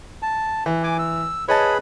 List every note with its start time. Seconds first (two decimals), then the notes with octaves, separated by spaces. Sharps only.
0.22 A5
0.66 E3
0.84 G#5 D6
0.99 E6
1.48 G#4 B4 C#5 D#5 A5 B5